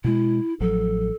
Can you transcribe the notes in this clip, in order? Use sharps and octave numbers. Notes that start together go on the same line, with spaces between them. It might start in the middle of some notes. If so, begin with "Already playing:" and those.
B2 G#3 E4
A1 F3 F#3 A4